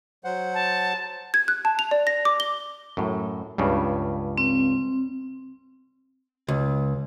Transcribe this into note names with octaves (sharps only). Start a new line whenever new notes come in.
F#3 C5 F#5
A5
G#6
F#6
A5
F7
D5
A#6
D6
G7
F#2 A2
C#2 G2 C#3
C4
C#2